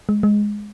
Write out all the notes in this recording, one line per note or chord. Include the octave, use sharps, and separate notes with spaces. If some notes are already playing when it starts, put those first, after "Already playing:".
G#3
G#3